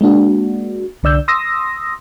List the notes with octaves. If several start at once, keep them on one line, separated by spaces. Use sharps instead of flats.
G#3 A#3 D4 F#4
C2 D3 D5 E6 G6
C6 D#6 E6 A#6